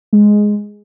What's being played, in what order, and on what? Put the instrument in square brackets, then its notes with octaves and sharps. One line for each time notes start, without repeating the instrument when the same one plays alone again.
[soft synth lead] G#3